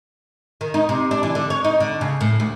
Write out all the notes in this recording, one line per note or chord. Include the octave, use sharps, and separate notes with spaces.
D#3
D#4
C3
D4
E3
D3
C#5
D#4
D3
C#3
A2
D2